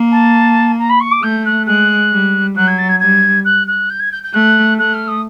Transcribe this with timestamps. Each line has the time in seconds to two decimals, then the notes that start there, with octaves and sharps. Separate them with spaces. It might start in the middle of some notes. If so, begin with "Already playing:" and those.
Already playing: A#3
0.11 A5
0.78 A#5
0.89 B5
1.00 C#6
1.11 D6
1.22 A3 G6
1.45 F#6
1.66 G#3 F#6
2.12 G3
2.55 F#3 F#6
2.67 G#6
2.78 A6
2.88 G#6
2.99 G3 G#6
3.44 F#6
3.67 F#6
3.89 G6
3.99 G#6
4.11 G6
4.23 G6
4.33 A3 F#6
4.78 A3 F#6
4.93 F6
5.07 D#6